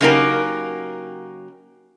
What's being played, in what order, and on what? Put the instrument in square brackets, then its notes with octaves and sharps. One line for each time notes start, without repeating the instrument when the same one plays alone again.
[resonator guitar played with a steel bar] C#3 F#3 A#3 D#4 G4 A#4